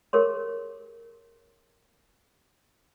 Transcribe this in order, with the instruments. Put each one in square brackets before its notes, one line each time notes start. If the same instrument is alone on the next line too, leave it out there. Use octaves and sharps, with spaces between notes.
[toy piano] G4 G#4 A#4 C#5 C6